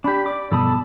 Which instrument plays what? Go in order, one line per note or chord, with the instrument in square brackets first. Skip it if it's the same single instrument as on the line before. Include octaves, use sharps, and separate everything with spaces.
[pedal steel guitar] D4 G4 [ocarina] B5
[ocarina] D5 [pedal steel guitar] D6
[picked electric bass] G2 B2 F3 [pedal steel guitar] A4 B5 D#6 [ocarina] A5